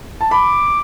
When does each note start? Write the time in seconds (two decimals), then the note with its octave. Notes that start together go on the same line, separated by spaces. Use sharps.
0.21 A5
0.31 B5 D6